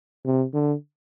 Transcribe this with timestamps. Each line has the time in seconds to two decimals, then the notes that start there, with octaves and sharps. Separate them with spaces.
0.25 C3
0.53 D3